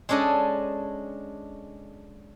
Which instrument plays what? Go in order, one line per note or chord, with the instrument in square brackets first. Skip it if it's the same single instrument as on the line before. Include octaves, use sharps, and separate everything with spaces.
[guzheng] G#3 C#4 D4 A4 D#5